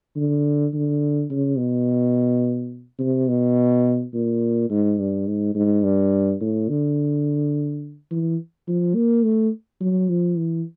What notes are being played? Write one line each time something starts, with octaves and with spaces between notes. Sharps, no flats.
D3
D3
C#3
B2
C3
B2
A#2
G#2
G2
G#2
G#2
G2
A2
D3
E3
F3
A#3
A3
F#3
F3
E3